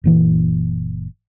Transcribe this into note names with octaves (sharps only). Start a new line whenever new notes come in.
F#1 A#2 E3